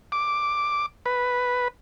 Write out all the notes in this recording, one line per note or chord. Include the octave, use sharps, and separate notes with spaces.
D6
B4